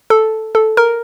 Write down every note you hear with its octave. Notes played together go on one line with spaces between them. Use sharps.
A4
A4
A#4